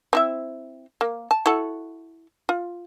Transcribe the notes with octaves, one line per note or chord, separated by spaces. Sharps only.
C4 E4 E5
A#3
A5
E4 F#4 A4
F4